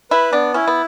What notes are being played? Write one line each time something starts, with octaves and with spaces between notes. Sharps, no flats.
E4 B4
B3 D4
C#4 E4
B3